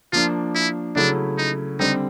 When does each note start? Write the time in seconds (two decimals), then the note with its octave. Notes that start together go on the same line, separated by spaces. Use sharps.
0.12 F3 A#3 D4 F4
0.55 E4
0.96 C#3 F#3 A3 C#4 D4 E4
1.38 D#4
1.79 D3 G3 C4 D#4